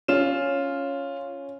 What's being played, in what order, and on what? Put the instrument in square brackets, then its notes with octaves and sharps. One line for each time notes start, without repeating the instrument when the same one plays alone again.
[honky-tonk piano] C#4 [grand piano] F4 E7